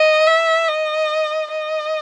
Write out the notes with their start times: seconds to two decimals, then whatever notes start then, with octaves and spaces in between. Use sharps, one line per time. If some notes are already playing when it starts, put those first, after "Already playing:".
Already playing: D#5
0.27 E5
0.69 D#5
1.51 D#5